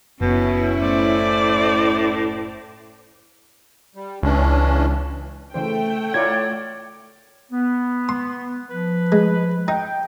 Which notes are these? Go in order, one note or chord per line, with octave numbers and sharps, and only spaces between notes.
F#1 B2 C#4 E4
A2 C5 D5
G3
C#2 E3 C#4 D4
C#3 E3 A3 C5 G5
E4 F4 A#4 C#5 D5 G#6
B3
C6
F3 B4
G#3
D#4 G5